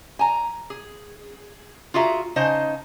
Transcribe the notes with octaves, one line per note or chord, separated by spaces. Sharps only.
G#5 A#5
G#4
F4 F#4 G#4 E5 A#5
C#3 D#4 C5 D#5 A5